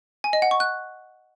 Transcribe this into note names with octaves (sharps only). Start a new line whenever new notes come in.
G#5
D#5
F#5
C#6
F#6